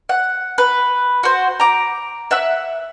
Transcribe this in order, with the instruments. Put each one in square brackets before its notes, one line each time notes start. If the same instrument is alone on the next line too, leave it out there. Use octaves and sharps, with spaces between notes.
[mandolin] F#5
B4
F#4 C5
A#5 D6
E5 F#5 E6